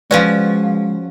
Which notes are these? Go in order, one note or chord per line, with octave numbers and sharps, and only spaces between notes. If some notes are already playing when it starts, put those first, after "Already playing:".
F3 G#3 C#4 F#4 B4 C5 D5